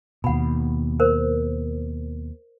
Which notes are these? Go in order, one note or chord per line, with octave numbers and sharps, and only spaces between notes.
D#2 B2 F#5 B5
A#4 C5